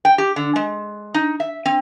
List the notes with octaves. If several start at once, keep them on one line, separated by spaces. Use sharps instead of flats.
G5
G4
D3
G#3
D#4
E5
C4